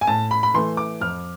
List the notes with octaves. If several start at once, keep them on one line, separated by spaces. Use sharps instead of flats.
G#5
A2 A5
B5
B5
E3 A3 C6
D6
F2 F6